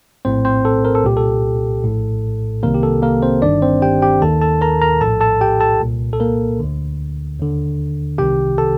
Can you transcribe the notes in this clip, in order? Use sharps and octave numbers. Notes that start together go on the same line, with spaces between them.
A#1 A2 C4 C5
C4 C5
A4
A#4
A4
C2 A#2 G4
A4
A#1 A2
C2 C3 D#3 A#3 A#4
G4
A4
A#3 A#4
C4 C5
G1 G2 D#3 D4 D5
C4 C5
G4 G5
G4 G5
D#2 D#3 A4 A5
A4 A5
A#4 A#5
A#4 A#5
A#1 A2 A4 A5
A4 A5
G4 G5
A4 A5
C2 A#2
A4
A#3 A#4
D2 D3
D#2 D3
C2 C3 D#3 G4 G5
A4 A5